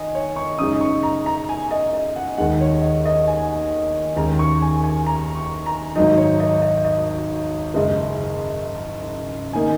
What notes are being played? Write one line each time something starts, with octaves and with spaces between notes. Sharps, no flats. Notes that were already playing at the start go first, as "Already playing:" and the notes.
Already playing: D#3 D#5 G#5
C#5
C#6
F#2 C#3 G#3 D#4 D#6
C#6
A#5
A#5
G#5
D#5
D#5
F#5
D#2 D#3 G#3 F#5
C#5
D#5
D#5
G#5
D#2 D#3 G#3 C#4 A#5
C#6
G#5
G#5
A#5
C#6
A#5
G#1 G#2 F#3 D#4 D#5
C#5
D#5
D#5
D#5
F#1 F#2 C#3 G#3 D#5
D#3 A#3 D#4 G#5